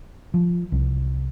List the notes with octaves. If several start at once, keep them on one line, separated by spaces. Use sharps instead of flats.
F3
C2